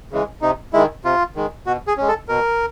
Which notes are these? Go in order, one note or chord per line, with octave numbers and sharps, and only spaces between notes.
C#3 E3 G#3
C3 D#4
D#3 G#3 E4
C3 F4
D#3 G#3
B2 F#4
G#4
G#3 C#4
A4
B2 A#4